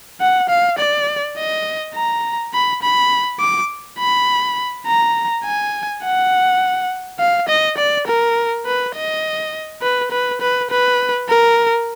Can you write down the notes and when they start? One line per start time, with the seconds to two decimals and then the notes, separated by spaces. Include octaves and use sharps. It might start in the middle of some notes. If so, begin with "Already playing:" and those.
0.21 F#5
0.49 F5
0.78 D5
1.37 D#5
1.95 A#5
2.53 B5
2.82 B5
3.40 D6
3.99 B5
4.87 A#5
5.44 G#5
6.04 F#5
7.20 F5
7.49 D#5
7.78 D5
8.07 A#4
8.66 B4
8.95 D#5
9.82 B4
10.11 B4
10.41 B4
10.70 B4
11.28 A#4